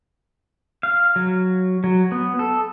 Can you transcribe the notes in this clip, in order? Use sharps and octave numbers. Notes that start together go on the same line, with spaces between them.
F5
F#3
F#3
B3
A4